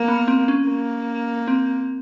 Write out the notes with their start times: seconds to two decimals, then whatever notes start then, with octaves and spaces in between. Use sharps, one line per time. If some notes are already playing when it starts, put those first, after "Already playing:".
Already playing: A#3
0.08 B3
0.28 C4
0.48 C#4
0.68 A#3
1.48 C4